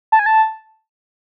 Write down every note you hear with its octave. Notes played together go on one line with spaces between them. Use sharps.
A5
G#5
A5